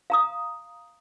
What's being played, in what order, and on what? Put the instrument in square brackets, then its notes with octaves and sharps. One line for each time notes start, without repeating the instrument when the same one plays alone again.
[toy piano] F5 A#5 D#6